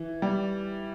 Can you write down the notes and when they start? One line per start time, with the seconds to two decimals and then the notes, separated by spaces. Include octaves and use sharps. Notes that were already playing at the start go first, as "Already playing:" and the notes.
Already playing: E3
0.22 G3